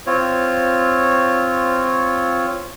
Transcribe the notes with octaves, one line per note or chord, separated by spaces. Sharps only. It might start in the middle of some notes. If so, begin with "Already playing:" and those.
C4 F4 C#5